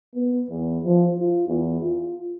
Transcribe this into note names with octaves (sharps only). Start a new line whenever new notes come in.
B3
E2
F3
F4
E2
F4